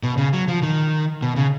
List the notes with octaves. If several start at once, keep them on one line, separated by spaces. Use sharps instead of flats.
B2
C#3
F#3
F3
D#3
B2
C#3